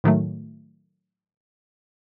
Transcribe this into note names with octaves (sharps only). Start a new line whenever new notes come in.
A2 D#3 F#3 A3